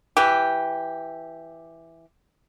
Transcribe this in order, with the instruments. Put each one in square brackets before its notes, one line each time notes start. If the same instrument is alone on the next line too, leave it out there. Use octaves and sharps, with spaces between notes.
[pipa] E3 G4